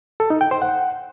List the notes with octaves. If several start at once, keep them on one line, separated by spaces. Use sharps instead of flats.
A4
D#4
G5
C5
F#5